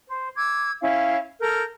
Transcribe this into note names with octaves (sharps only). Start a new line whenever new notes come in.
C5
D6 E6 G#6
C#4 E4 F5
A4 A#4 F6 G6